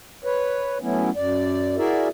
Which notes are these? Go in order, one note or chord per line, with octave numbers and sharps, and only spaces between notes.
B4 C#5
F#3 A3 B3 C#4 E4
F#2 D5
E4 F#4 G#4 A#4 D5 E5